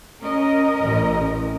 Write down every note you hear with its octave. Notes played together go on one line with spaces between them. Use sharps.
C#4 A#4 D#5
A1